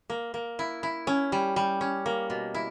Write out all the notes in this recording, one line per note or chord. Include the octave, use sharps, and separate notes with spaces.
A#3
A#3
E4
E4
C#4
G3
G3
C#4
A#3
B2
E4